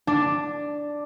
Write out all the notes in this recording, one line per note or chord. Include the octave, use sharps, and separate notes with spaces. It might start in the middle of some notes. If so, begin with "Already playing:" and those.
D4